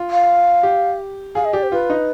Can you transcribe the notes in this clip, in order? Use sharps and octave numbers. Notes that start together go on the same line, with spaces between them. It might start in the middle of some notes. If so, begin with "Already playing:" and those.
Already playing: F4
F5
G4
G#4 F5
D#5
G4 D5
C5
F4 B4
D#4